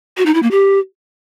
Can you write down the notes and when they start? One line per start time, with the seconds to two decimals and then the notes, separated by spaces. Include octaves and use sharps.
0.17 F#4
0.26 D#4
0.34 E4
0.43 A#3
0.51 G4